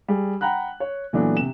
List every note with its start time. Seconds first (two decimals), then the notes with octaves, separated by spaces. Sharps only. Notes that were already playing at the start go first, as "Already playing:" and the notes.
0.08 G3 G#4
0.41 F#5 G5 A#5 B5 F#6
0.80 C#5
1.13 A#2 E3 F#3 A3 B3 D4
1.37 C3 E7